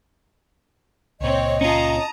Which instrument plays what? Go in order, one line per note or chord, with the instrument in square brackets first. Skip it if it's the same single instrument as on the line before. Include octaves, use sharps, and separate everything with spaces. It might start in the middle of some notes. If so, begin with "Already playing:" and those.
[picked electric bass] C#2 A#2 [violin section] C4 C#5 [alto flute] D#5
[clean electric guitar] C#4 F4 [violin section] A5 A#5 D#6